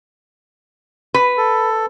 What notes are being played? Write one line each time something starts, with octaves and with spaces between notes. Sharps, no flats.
B4
A4